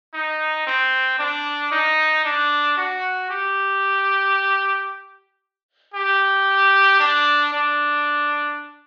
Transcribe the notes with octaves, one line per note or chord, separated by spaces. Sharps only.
D#4
C4
D4
D#4
D4
F#4
G4
G4
D4
D4